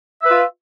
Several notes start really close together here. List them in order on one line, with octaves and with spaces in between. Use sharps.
E5 B4 F4